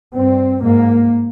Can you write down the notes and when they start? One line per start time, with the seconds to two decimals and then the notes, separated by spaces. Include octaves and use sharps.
0.14 G2 C4
0.62 G#2 A#3